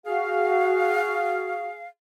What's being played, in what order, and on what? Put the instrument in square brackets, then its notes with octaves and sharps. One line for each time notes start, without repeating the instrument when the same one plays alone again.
[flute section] F#4 [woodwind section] G#4 F5